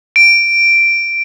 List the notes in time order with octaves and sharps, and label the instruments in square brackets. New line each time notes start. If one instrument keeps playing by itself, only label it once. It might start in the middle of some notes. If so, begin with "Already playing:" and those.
[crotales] D7